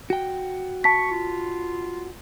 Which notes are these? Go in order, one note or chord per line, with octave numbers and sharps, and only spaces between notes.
F#4 G5
A5 C#6 B6
F4